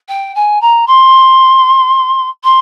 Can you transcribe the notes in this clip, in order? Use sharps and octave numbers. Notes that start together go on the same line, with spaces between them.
G5
G#5
A#5
C6
C6